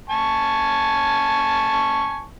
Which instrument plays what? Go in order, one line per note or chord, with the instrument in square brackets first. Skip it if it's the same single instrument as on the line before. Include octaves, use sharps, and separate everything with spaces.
[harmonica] G#5 A5 C#6